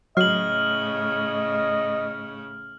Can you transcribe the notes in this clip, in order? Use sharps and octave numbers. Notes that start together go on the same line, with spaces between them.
A2 C#3 F#3 F#4 D#5 F6 C7 F#7